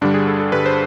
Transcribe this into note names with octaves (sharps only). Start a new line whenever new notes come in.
G2 D3 G3 D4
G#4
A4
A4
G2 D3 G3 B4
C5